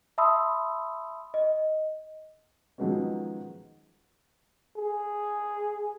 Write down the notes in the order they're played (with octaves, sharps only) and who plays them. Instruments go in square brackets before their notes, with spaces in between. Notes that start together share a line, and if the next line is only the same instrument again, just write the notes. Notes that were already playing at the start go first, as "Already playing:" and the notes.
[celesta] E5 A5 B5 C6 D#6 E6
D#5
[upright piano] D#3 F3 F#3 G#3 B3 C#4
[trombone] G#4